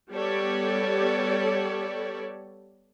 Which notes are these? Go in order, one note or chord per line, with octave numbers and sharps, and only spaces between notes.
G3 B3 G4 A4 C#5 D5